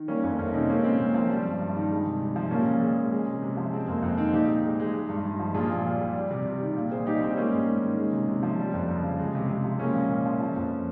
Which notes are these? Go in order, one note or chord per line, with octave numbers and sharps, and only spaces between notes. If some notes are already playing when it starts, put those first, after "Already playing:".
Already playing: D#3
G3 A#3 C#4
F2 A#3 C#4
F2 A#3 C#4
C3 C4 D#4
G#3 A#3 C#4
A#2 C4
A#2 A#3
F3 C4
G3
G2
G2
D#3
G#3
C3
C3
F3
A#2 A#3 C#4
A#2
G#3
G#3
G#3
C3
C3
F3
G#3 C4
F2 A#3
F2 C4
D#3 C4 D#4
A#2 D#4 G4
A#2
G#3
G#3
G#3
G2
G2
F3
A#2 F4 G#4
A#2
G3
G3
G3
C3
C3
D#3
A#2
A#2 G#4 C5
G3 D#4 G4
G3 C4 D#4
G#3 A#3 C#4
G#2
G#2
D#3
G#3
C3
C3
F3
G3
F2
F2
C#3
G#3
C3
C3
F3
G#3 A#3 C#4
A#2
A#2
F3
F3
F2